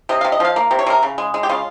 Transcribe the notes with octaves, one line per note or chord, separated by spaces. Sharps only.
C3 D#5
C3 F5
D#5
F3 F5
A#3
C3
C#5
C3 A#4
C#3
G#3
G#3
G4
C#3 F4